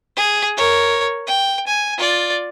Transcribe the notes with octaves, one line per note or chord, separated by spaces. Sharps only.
G#4
A#4 C#5
G5
G#5
F4 D5